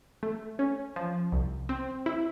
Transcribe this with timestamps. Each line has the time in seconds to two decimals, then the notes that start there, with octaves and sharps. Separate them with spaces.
0.23 A3
0.59 C#4
0.96 F3
1.32 C2
1.69 C4
2.06 E4